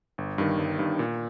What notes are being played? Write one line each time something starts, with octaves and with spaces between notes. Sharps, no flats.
G1
G2 D#3
G1
G2 D#3
A#2